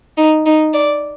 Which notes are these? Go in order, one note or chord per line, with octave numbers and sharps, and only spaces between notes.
D#4
D#4
D5